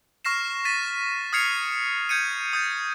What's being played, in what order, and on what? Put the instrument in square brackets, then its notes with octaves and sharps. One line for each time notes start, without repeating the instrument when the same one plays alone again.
[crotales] C#6 F6 A#6 C7 E7
A6 B6 C7 D#7
D#6 F6 G#6 C7 C#7 F7
G6 G#6 C#7 D#7
D#6 G6 A6